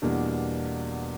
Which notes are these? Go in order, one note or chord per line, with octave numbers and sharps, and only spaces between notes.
E2 B2 G3 A#3 D4